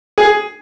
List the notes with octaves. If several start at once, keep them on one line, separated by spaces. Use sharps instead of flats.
G#4 G#5